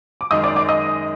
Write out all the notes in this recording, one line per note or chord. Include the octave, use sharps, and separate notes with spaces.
D6
F#2 D#3 G#3 D#5 D#6
D5 D6
D5 D6
D#5 D#6